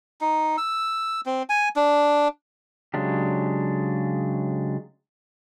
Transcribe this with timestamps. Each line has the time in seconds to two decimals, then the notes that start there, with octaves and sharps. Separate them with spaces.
0.21 D#4
0.58 E6
1.26 C4
1.49 G#5
1.76 D4
2.94 C#3 F#3 G#3 D4 G4